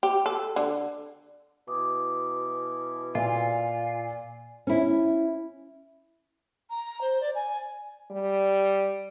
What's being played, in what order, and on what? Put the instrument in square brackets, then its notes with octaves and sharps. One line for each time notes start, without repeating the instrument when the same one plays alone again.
[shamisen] G4
A4
D3
[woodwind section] B2 E3 E4 [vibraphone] D6 D#6
[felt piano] A#2 [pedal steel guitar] F4 [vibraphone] D5 G#5
[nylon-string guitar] C#4 E4
[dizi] A#5
C5
D5
G#5
[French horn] G3